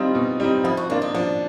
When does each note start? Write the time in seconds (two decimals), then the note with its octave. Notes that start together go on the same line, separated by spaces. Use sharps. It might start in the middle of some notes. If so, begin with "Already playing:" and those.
Already playing: G3 C4 D#4 F4
0.15 B2
0.40 G3 C4 D#4
0.64 F3 E4
0.77 F#4
0.89 A#3 D4 F4
1.02 D#4
1.14 F3 D4